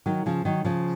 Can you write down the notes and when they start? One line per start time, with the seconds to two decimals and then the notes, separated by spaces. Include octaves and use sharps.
0.06 D#3 F#3
0.26 C#3 F3
0.45 D#3 F#3
0.65 C#3 F3